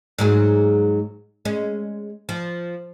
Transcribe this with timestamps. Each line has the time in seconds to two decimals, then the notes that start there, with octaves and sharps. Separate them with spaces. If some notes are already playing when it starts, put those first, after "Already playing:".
0.19 G#2 F#3 G#4
1.45 G#3 C#4
2.29 F3